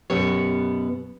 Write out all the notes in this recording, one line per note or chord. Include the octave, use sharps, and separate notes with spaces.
F#2 B2 B3 C#4 G4 C#5